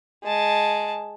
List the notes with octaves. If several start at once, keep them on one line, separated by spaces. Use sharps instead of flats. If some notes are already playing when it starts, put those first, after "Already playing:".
G#3 A5